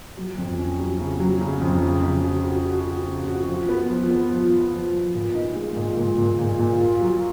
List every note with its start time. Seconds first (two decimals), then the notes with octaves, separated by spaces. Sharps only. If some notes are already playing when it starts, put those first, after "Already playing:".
0.17 F#3
0.38 F2
0.58 C#4
0.79 F#3
1.00 C#3
1.20 F#3
1.41 C#3
1.62 F2
1.83 C#3
2.04 C#3
2.24 F#4
2.44 F#4
2.65 F#4
2.87 F#4
3.08 C#3
3.28 F#4
3.48 F3
3.69 B3
3.90 F3
4.11 B3
4.31 F3
4.52 F3
4.73 F3
4.93 F3
5.14 A#2
5.35 D#4
5.56 G#3
5.76 A#2
5.97 A#2
6.18 A#2
6.39 A#2
6.59 A#2
6.80 F4
7.00 F#3